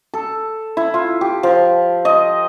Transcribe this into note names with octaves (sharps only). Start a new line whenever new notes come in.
A4
E4
F4
G4
F3
D#5